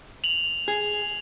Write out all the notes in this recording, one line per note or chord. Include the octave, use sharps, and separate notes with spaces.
F7 F#7
G#4